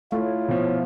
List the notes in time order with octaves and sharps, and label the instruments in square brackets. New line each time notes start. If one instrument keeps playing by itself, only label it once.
[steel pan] A3 [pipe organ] E4 F4 [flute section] C#5
[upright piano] B2 F3